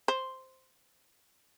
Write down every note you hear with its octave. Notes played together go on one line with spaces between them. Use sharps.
C5